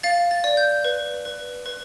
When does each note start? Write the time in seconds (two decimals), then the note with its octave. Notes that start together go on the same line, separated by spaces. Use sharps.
0.03 F5 A6
0.31 A6
0.44 D5
0.57 G6
0.84 B4
1.25 B4
1.66 B4